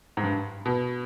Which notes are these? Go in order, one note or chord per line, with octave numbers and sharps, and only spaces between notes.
G#2
G2
B2